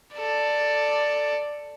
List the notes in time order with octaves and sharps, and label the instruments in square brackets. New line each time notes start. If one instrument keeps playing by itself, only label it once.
[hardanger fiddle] A4 D5